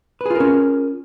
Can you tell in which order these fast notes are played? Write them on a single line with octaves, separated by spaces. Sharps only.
B4 G#4 F4 A#4 C#4